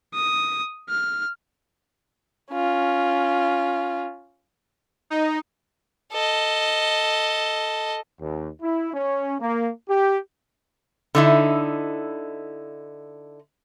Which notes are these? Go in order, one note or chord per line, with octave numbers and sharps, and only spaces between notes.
D#6
F6
C#4 F4
D#4
A4 D#5
D#2
E4
C#4
A#3
G4
D3 D#4 E4